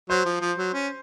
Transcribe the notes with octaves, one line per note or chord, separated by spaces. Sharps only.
F#3 C5
F3
F3
F#3
C#4